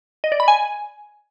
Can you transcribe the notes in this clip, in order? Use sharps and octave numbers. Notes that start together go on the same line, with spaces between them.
D#5
D5
B5
G#5